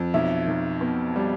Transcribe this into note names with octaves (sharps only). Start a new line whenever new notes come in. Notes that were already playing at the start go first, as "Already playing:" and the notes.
Already playing: F2
B1 E5
B1
B2
G3